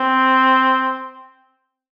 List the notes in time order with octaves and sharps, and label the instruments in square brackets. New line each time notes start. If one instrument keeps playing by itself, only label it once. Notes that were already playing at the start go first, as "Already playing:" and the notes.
Already playing: [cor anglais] C4